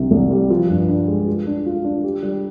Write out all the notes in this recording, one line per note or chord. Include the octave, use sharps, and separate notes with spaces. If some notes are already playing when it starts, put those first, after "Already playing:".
Already playing: C2 C3 D4
C2
G3
F3
G2
D4
G#3
F4
D4
F4
D4
G4
G3